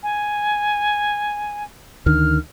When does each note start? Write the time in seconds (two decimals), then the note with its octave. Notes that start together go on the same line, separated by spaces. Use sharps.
0.03 G#5
2.06 D2 D3 D#3 F6